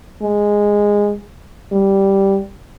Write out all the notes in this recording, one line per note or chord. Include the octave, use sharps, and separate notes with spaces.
G#3
G3